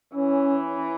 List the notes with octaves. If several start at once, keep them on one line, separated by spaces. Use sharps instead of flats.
E3 C#4